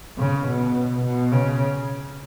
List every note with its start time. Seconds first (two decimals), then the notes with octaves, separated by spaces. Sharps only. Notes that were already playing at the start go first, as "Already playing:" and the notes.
0.18 C#3
0.47 B2
1.04 B2
1.32 C#3